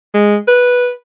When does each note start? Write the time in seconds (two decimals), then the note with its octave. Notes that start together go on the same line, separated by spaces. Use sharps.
0.14 G#3
0.48 B4